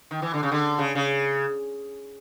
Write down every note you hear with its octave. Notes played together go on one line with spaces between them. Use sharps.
D#3
E3
D3
C#3
D3
C#3
C#3